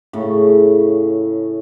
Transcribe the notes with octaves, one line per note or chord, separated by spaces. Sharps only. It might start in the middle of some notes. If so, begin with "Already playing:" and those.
A2 C#3